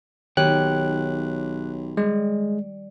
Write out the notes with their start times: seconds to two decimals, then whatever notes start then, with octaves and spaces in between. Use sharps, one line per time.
0.37 B1 D#3 G4 C#5 G5 F#6
1.97 G3 G#3